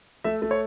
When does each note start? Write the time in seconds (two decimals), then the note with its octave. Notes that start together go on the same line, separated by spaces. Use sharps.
0.24 A3 E5
0.42 A3
0.51 C#5